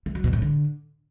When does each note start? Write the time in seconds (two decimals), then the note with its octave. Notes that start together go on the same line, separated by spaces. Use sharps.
0.06 A3
0.15 F#3
0.24 B2
0.33 A2
0.42 D3